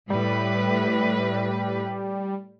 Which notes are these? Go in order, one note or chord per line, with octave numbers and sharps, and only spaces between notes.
A2 G3 B4